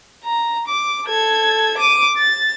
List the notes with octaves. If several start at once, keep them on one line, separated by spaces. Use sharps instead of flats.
A#5
D6
A4 G#6
D6 D#7
A6